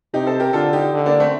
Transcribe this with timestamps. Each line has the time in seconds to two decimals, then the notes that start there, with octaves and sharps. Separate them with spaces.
0.13 C3 D#4 G4
0.27 A4 C5
0.40 G4 A#4
0.53 D3 F4 A4
0.73 D#4 G4
0.93 D3
1.06 A#3 D4
1.20 A3 C4